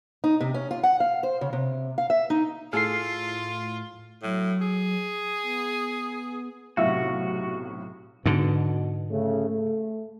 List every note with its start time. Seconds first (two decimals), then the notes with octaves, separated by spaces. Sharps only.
0.24 D#4
0.41 C3
0.54 C#4
0.71 F4
0.83 F#5
1.00 F5
1.23 C5
1.41 C#3
1.53 C3
1.98 F5
2.10 E5
2.30 D#4
2.73 A2 F4 G#4 A4 F6 C7
4.23 A2 F#3
4.61 G#4
5.43 B3
6.77 B1 A2 C3 F#4 E5 F5
8.26 G#2 B2 D3
9.11 C#3 A3
9.50 A3